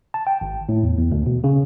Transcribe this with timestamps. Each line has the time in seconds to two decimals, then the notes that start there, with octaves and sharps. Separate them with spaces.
0.14 A5
0.27 G5
0.41 G#1
0.69 A2
0.83 E2
0.98 E2
1.12 D2
1.26 B2
1.44 C#3